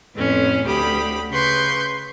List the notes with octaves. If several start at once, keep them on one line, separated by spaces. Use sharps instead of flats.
F2 A2 B3 C#4
D2 G4 B5 D#6
C#3 B4 C6 C#6 G6